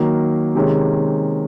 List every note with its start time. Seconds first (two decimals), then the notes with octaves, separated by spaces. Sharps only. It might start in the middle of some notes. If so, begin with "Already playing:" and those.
Already playing: D#3 F#3 A#3
0.55 C3 D#3 G#3 C#4